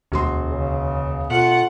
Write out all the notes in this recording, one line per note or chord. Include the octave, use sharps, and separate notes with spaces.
E1 D2 F#4 C6
C#3
D2 B2 A3 F4 F#5